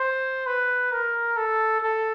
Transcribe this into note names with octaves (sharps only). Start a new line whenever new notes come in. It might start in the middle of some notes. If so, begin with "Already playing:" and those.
Already playing: C5
B4
A#4
A4
A4